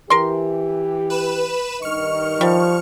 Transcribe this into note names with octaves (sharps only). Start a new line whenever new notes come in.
E3 G4 A#4 C6
B4 E7
G2 D#3 D#5 C#6 F6
F3 G3